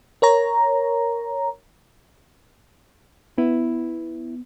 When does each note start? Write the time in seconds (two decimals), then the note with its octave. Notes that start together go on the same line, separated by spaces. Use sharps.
0.22 A#4 C#5 A#5
3.38 B3 E4